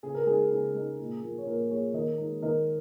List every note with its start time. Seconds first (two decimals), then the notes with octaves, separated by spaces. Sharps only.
0.03 C#3 G#4
0.15 A#4
0.26 G#3 D#4 G#4
0.51 C#3 G#4
0.74 G#3 D#4
0.99 A#2
1.22 F3 A#3
1.38 C#5
1.46 A#2 F4 A#4
1.70 F3 A#3 G#4 C#5
1.94 D#3 A#4 D#5
2.18 G#3 D#4
2.42 D#3 A#4 D#5